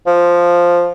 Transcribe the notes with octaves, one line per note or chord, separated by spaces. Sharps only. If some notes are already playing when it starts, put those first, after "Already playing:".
F3